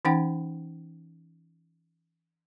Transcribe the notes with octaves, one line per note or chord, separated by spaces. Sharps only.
E3 C#4 D#4 F#5 G5